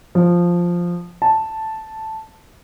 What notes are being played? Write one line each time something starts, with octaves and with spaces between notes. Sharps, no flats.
F3
A5